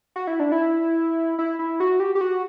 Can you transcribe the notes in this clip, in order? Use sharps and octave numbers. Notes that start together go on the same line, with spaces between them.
F#4
E4
D4
E4
E4
E4
F#4
G4
G4
F#4